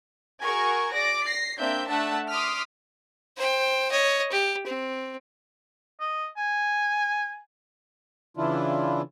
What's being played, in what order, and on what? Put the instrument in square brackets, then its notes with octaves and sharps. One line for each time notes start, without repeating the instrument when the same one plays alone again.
[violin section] F#4 G#4 A#4 G#5 C#6
D5 D6 A#6
A#6 C7
A#3 C4 D4 E5 G6
A3 D4 E5 F#5 A5
C6 D6 D#6 F6 B6
[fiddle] C5 G5
C#5 D#5
G4
C4
[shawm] D#5
G#5
[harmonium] C#3 E3 D4 E4 F4